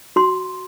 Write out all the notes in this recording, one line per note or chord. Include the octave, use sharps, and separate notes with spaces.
F#4 C6